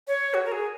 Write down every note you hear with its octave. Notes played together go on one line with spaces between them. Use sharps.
C#5
F#4
A#4
G#4